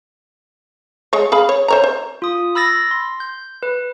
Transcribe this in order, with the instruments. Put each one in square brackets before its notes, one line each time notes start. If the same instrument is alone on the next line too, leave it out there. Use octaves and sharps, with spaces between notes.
[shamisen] G#3 C#5
G#4 F5 B5
C#5
C5 C#5 A#5
C5
[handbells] F4 D#6
B5 E6 A6 A#6
C6
G6
B4